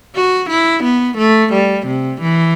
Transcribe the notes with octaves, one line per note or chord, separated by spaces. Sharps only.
F#4
E4
B3
A3
G3
C3
E3